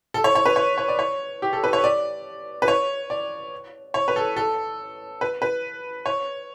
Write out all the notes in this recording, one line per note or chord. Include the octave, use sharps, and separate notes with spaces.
A4
C#5
C#5
B4
C#5
C#5
D5
C#5
G4
A4
B4
C#5
D5
B4
C#5
D5
C#5
B4
A4
A4
B4
B4
C#5